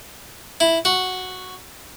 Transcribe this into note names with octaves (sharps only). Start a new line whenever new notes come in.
E4
F#4